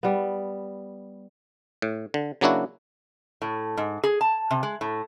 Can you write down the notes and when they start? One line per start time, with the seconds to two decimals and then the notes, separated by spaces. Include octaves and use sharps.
0.03 G3 B3
1.82 A2
2.14 D3
2.41 C#3 F#3 A#3 D4 E4 F#4
3.42 A2
3.77 G#2
4.04 G#4
4.21 A5
4.51 C3
4.63 G#3
4.81 A2